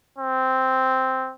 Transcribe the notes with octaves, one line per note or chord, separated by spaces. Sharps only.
C4